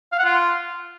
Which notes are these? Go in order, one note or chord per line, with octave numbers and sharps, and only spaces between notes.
F5
F#5
F4